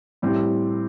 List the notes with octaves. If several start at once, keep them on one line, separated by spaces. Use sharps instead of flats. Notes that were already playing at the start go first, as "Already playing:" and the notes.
A2 G3 C4